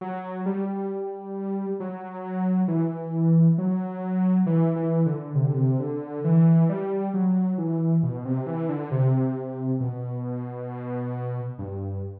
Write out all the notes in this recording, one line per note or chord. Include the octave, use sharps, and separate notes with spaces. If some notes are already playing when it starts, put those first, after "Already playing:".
F#3
G3
F#3
E3
F#3
E3
E3
D3
C3
D3
C3
D3
E3
G3
F#3
E3
B2
C3
E3
D3
C3
B2
G2